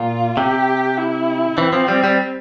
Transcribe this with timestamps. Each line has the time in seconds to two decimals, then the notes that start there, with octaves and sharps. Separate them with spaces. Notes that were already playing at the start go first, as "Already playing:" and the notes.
Already playing: A#2 F4
0.36 C3 G4
0.97 E4
1.58 E3 C4
1.73 F3
1.88 G3
2.04 G3